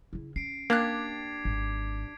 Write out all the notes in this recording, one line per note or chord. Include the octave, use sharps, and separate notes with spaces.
C#3 E4
C#4 C7 D7
A#3 D4 G4 D6 F#6 G#6 B6
G#1